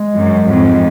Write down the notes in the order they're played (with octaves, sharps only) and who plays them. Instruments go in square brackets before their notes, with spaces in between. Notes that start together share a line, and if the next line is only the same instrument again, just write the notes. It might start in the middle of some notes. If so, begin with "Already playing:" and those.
Already playing: [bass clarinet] G#3
[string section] F#2
F2 G#2